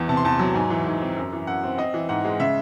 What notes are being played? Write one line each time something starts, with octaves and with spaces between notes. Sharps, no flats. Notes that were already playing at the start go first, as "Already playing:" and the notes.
Already playing: E2 E3
C3 A5
C6
E2 A5
F#3
G#2 G#5
E3
G#2
C4
F#2
E3
F#2 F#5
C4
C4 D#5
E3
G#2 F#5
G#3
C#3 E5